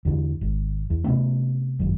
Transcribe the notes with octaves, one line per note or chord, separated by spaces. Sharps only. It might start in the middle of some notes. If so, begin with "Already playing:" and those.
E2 D3 E3
G#1
E2
C3 A3 B3 C#4
G#1 F#2